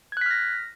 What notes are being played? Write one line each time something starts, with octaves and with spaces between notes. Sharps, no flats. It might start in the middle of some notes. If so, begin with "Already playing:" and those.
F6 F#6 G#6 A#6 B6